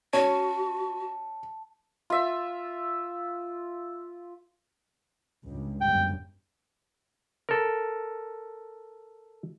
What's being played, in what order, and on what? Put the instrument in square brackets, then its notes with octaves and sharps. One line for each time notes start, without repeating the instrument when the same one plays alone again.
[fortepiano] C#4 [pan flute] F#4 [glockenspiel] A5
[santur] F4 E5
[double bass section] C#2 G2
[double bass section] G1 F#2 [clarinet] G5
[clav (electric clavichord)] A4 A#4